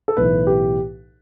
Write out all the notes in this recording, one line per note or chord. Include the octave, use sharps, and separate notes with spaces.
A4
B1 A2 E3 B4
G4